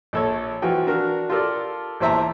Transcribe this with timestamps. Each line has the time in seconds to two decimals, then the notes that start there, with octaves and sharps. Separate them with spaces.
0.13 A#1 A4 C#5
0.62 E3 F3 F#4 G5
0.87 D4 F#4 A#4
1.30 F4 G4 A4 A#4 D5
2.00 A#1 E2 C5 E5 A5 A#5